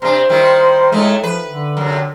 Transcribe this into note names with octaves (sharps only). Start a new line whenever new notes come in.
C3 D4 C5
D#3 G3 E4
A2 G#3 A3 D#4
F3 B4
D3
F#2 C3